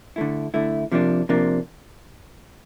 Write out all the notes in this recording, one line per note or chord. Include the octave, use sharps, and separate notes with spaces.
D3 A3 E4
D3 A3 E4
C3 F3 A#3 D4
C3 F3 A#3 D4